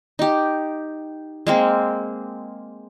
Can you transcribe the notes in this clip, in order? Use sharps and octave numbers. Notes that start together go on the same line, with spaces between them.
D#4 G4
G#3 A#3 C4